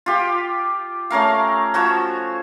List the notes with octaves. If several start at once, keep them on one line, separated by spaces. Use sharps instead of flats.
F4 G4
A3 C#4 A#4 F5
F3 F#4 C#5 A5